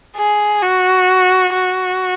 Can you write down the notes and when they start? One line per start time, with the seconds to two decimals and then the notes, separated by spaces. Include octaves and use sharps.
0.16 G#4
0.62 F#4
1.53 F#4